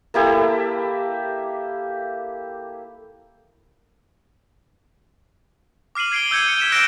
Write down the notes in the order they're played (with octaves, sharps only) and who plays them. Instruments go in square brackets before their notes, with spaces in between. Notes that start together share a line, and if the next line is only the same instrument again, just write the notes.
[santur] A#3 E4 G4 A4
[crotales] D6 F6 C7 D#7 F#7
G#6 C7 D7 F#7 G7
E6 G6 G#6 C#7 D#7
C#7
E6 G#6 B6 D#7 E7
E6 F#6 G6 A#6 D7 E7